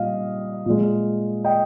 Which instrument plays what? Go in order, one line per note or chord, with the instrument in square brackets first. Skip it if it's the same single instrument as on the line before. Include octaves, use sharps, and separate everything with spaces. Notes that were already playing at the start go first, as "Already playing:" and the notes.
Already playing: [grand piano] A#2 G3 D#5 F5
A#2 G#3
D#5 G5